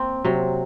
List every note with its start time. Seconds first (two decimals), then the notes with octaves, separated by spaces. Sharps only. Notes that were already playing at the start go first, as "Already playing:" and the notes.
Already playing: A#3 C4
0.25 C3 F#3